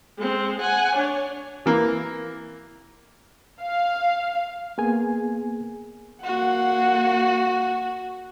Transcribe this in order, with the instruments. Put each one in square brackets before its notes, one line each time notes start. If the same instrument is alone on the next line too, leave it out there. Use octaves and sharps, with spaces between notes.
[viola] G#3 C4
F#5 G#5
D4 C#5
[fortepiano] E3 A#3
[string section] F5
[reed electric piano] A#3 B3 G#4 G#5
[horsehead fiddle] A#3 F#5 [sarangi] F#4